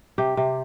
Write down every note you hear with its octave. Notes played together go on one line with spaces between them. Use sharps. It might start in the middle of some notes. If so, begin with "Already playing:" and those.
C3 G4
C3